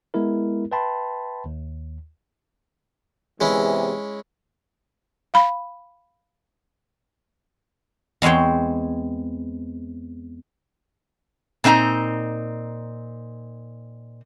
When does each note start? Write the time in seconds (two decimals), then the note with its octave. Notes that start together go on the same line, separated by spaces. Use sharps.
0.14 G#3 B3 E4 A#4
0.72 B4 E5 G5 A5 B5 C6
1.46 D#2
3.41 E2 C3 E3 G#3 C#4 E4
5.34 F5 B5
8.22 E2 G#3 C4 C#5 G5
11.64 A#2 C4 D#4 G#5 A#5